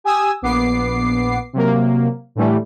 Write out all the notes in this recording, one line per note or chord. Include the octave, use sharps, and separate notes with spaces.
G4 G#5 D#6 E6
A#1 B3 D6 C7
C3 F#3 A#3
A2 D3 E3 G3 A3